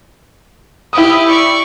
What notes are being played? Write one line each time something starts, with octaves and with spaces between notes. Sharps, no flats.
E4 G4 B4 D#6
D5 C#6